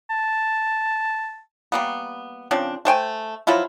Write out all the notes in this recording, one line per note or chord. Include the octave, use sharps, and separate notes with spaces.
A5
G3 A#3 B3
C#3 F3 C4 D4
A3 C5 G5 G#5
F3 F#3 E4 F4